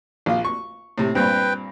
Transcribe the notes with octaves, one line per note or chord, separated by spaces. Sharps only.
A#1 F4
C#6
A2 C3
G2 A#2 C4 B4 G5